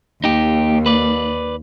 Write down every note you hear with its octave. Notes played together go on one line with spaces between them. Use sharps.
D#2 D#4 G4
B4 D5